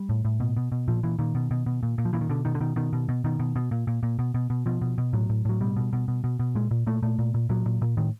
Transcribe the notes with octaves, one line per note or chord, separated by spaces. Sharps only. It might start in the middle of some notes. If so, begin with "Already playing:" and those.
Already playing: G3
A2
A2
B2
B2
B2
A#2 F3
A#2 E3
A#2 D#3
B2
B2
B2
A#2
A#2
F3
A#2 E3
D#3
B2 D3
B2 D#3
D3
B2 D#3
B2 D#3
B2
B2
B2 D#3
B2
B2
A#2
A#2
A#2
B2
B2
B2
B2 F3
B2
B2
A2 F#3
A2
A2 F#3
B2 G3
B2
B2
B2
B2
B2
A#2 G#3
A#2
A#2 A3
A#2 A3
A#2
A#2
A#2 F#3
A#2
A#2
A2 D#3